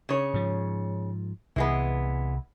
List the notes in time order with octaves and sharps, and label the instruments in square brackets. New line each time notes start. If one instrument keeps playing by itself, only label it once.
[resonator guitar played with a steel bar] C#3 C#5
[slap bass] G#2 F3
[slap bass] C2 [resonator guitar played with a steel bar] E3 G#3 B3